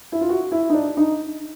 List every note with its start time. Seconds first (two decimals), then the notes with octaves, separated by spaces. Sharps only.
0.12 E4
0.21 F4
0.29 F#4
0.52 E4
0.70 D#4
0.74 D4
0.97 D#4